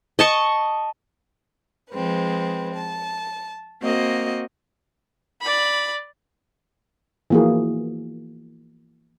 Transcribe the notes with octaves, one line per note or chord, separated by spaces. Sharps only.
D#5 A5 C#6
F3 G#3 C4 B4
A5
A#3 C4 F#4 D#5
D5 B5
E3 F3 A#3 F#4 G#4